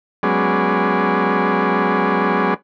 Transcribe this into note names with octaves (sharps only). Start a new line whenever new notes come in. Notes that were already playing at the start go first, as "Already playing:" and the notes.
F#3 G#3 B3 C#4 G#4 D5